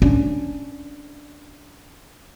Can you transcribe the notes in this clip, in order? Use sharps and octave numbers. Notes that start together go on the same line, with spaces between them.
C#4 D4